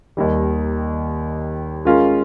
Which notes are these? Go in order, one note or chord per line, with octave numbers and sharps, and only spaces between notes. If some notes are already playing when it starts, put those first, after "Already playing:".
D#2 D#3 G3
G#3 C#4 F4 A#4